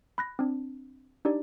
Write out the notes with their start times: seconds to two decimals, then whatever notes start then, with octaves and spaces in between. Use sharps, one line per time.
0.18 B5 F#6 A#6
0.39 C4 D4
1.25 D4 D#4 G4 D5